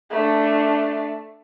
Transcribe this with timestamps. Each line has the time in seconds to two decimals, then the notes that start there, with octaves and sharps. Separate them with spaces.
0.11 A3 D4